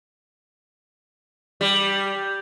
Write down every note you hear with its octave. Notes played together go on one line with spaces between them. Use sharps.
G3